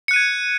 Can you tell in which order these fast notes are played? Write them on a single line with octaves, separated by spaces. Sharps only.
C#7 F#6 D#7 G#6